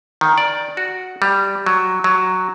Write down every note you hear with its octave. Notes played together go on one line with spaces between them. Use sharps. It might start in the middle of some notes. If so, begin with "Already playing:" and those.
D#3
D5
F#4
G3
F#3
F#3